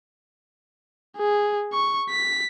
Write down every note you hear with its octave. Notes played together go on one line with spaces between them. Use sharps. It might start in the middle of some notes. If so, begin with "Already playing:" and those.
G#4
C#6
B6